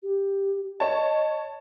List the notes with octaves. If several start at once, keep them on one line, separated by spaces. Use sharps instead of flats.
G4
C#5 D#5 A5